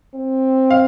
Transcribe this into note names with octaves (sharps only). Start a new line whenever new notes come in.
C4
F5